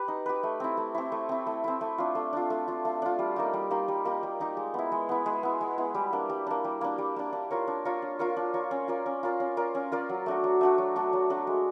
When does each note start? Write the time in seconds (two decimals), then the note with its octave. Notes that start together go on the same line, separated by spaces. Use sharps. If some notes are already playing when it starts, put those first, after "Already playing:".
Already playing: G4 B4
0.08 D#4
0.26 G4 B4
0.43 A3
0.60 C4 E4
0.77 A3
0.94 C4 E4
1.12 A3
1.29 C4 E4
1.47 A3
1.64 C4 E4
1.81 A3
1.98 D4 F4
2.15 A3
2.33 D4 F4
2.50 A3
2.68 D4 F4
2.85 A3
3.02 D4 F4
3.19 G3
3.36 A#3 D#4 G4
3.53 G3
3.71 A#3 D#4 G4
3.88 G3
4.05 A#3 D#4 G4
4.23 G3
4.40 A#3 D#4 G4
4.57 G#3
4.74 B3 E4
4.92 G#3
5.09 B3 E4
5.26 G#3
5.43 B3 E4
5.61 G#3
5.78 B3 E4
5.95 G3
6.13 A#3 D4
6.29 G3
6.47 A#3 D4
6.64 G3
6.81 A#3 D4
6.98 G3
7.16 A#3 D4
7.33 D4
7.51 F4 A#4 C#5
7.67 D4
7.85 F4 A#4 C#5
8.02 D4
8.19 F4 A#4 C#5
8.37 D4
8.54 F4 A#4 C#5
8.71 C#4
8.88 F4 A#4 D5
9.06 C#4
9.23 F4 A#4 D5
9.40 C#4
9.57 F4 A#4 D5
9.75 C#4
9.92 F4 A#4 D5
10.09 F#3
10.26 A3 D4 F#4
10.44 F#3
10.61 A3 D4 F#4
10.78 F#3
10.96 A3 D4 F#4
11.13 F#3
11.30 A3 D4 F#4
11.47 G#3